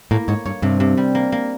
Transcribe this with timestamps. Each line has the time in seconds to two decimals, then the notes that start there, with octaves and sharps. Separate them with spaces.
0.11 A2 A#3
0.28 G#2 C#5
0.46 G2 C#5
0.62 G2 C3
0.80 C3
0.97 G3
1.15 A#3
1.32 A#3